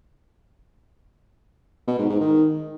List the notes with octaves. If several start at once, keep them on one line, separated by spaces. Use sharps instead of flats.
B2
G#2
G#2
D#3